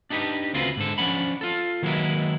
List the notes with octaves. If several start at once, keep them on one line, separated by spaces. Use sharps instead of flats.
D4 D#4 G4 B4
D2 C#3 C4 F4 F#4 B4
G#2 D3 A4
F3 C#4 D4 F#5 B5
F4 A4
D#3 F#3 G#3 A#3 E4 B4